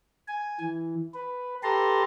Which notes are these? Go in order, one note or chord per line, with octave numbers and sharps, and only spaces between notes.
G#5
E3
B4
G4 A4 B4 A5 A#5 C6